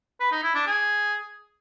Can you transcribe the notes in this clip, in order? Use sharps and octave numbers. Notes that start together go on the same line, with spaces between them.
B4
D#4
E4
D4
G#4